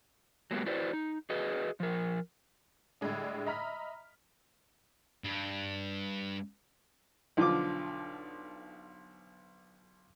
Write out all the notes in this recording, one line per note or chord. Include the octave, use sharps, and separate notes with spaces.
F#3 G#3 A#3 B3 G4
E4 F#4 B4 C5 D5
D#4
F#4 G#4 B4 D#5
F3 A#4
A2 D3 G3 G#3 D4
D#5 E5 A#5 B5 F6 B6
G2
B1 D3 F3 F4 D6